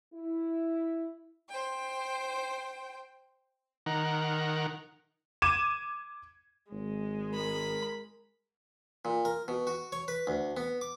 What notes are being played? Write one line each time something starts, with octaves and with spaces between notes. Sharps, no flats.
E4
C5 G5
D#3 A#4 F#5
D6 G#6 D#7 E7
G#1 G#3
A#4 B5
A#2
A#4
B2
F#4
C#5
B4
D2
B3
D6